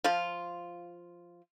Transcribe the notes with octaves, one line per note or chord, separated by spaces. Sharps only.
F3 F4